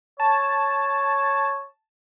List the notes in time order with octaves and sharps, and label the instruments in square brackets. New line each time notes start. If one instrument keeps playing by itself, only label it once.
[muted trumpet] C#5 [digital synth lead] A5